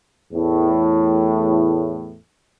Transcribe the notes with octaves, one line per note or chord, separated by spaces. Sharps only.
E2 A2